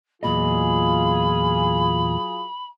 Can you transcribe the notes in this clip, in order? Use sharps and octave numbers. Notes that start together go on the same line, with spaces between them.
E2 A#2 F#3 F4 G#4 D#5 B5